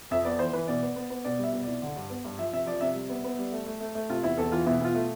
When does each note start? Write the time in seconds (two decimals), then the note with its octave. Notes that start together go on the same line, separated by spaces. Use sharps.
0.11 F2 E5
0.25 B3 D5
0.39 E3 C5
0.53 E3 B4
0.68 B2 D5
0.83 B3
0.96 B3
1.10 B3
1.24 B2 D5
1.39 G3 E5
1.53 B2
1.63 C2 D5
1.82 D3
1.96 G2
2.10 B3
2.24 G2
2.38 F3 E5
2.53 C3 E5
2.66 F3 D5
2.81 C3 E5
2.95 G3
3.09 B3
3.24 B3
3.39 G3
3.52 A3
3.66 A3
3.81 A3
3.95 A3
4.09 C3 F4
4.23 E2 E4
4.38 E2 A4
4.52 E3 F4
4.66 B2 E4
4.80 B2 F4
4.94 A3